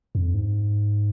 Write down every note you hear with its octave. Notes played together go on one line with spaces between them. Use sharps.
F2
G#2